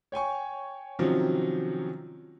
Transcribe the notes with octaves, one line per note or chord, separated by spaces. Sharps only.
C#5 G5 G#5 C#6
C3 D#3 F3 F#3 C#4